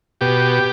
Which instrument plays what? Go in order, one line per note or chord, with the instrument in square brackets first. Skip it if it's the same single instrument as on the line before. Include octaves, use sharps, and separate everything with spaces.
[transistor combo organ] B2 G4